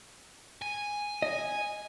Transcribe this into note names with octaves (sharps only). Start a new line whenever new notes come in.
G#5
D#5